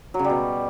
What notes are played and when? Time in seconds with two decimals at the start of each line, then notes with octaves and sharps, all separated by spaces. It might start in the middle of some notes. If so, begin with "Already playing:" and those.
0.14 F#3
0.19 C#3
0.24 G3
0.30 B2